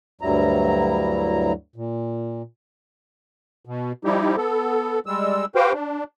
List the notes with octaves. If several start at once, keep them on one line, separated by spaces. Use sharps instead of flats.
D2 G2 F#3 G3 E4 A#5
A#2
B2
F3 G3 D#4 E4 G4
B3 A4
G3 G#3 E6
F#4 G4 B4 C5 F5 G5
D4